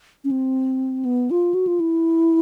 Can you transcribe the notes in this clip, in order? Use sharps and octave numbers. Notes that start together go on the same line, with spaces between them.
C#4
C4
B3
F4
F#4
F4
E4